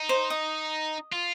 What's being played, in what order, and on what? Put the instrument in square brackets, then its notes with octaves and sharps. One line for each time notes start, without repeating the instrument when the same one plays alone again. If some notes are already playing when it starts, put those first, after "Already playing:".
Already playing: [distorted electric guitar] D#4
[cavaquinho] C5
D#5
[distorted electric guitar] F4